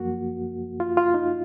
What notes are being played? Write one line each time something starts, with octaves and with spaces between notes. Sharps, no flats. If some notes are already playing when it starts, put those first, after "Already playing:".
Already playing: F#2 F3 A#3 F#4
F4
F4
D#4